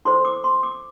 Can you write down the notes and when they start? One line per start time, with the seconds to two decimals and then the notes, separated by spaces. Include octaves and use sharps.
0.05 E4 A4 C5 C6
0.25 D6
0.44 C6
0.63 D6